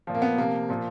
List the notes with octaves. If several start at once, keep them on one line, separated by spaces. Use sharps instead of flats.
A#2 F3
A#3
B3
C3 F3 A#3
A#2 F3